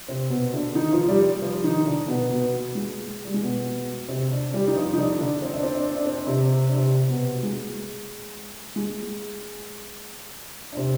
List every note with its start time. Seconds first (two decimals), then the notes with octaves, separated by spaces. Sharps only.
0.08 C3 C4
0.30 B2 B3
0.54 D3 D4
0.75 D#3 D#4
0.92 F3 F4
1.08 G3 G4
1.42 F3 F4
1.64 D#3 D#4
1.87 D3 D4
2.08 B2 B3
2.31 B2 B3
2.75 G#3
3.25 G3
3.34 G#3
3.42 B2 B3
4.09 C3 C4
4.31 D3 D4
4.54 G3 G4
4.68 D#4
4.76 F3 F4
4.93 D#4
4.98 D3 D4
5.20 D3 D4
5.42 C4
5.54 D4
5.63 C4
5.74 D4
5.86 C4
5.95 D4
6.06 C4
6.17 D4
6.27 C3 C4
6.69 D4
6.76 C3 C4
7.09 B2 B3
7.43 G#3
8.76 G#3
10.72 D4
10.77 C3 C4